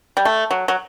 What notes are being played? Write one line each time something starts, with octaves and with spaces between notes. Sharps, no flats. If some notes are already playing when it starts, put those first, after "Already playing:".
G3
A3
F#3
F#3